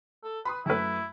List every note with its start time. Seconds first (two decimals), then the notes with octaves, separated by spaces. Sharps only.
0.24 A4
0.45 B4 B5 C6 D#6
0.66 F#2 A3 E4 B4